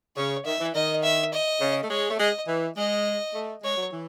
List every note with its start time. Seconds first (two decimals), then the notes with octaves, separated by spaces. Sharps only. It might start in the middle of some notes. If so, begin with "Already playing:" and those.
0.17 C#3 C#5
0.45 D#3 E5
0.60 E3
0.75 D#3 D#5
1.03 E5
1.33 D#5
1.61 C#3
1.83 A3
1.90 G#3 C#5
2.11 A3
2.20 G#3 D#5
2.48 E3
2.77 G#3 D#5
3.35 A3
3.64 G#3 C#5
3.77 F#3
3.92 E3